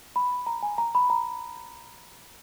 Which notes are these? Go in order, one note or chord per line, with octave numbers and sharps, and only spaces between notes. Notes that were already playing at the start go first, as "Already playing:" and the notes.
B5
A#5
G#5
A#5
B5
A#5